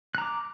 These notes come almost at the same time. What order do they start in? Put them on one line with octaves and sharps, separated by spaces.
F#6 A#5 D6